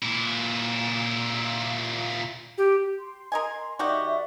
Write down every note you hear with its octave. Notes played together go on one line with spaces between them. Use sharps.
A#2 E4
G4
C6
A#4 D#5 G#5
D#3 F#4 G4 D5 E5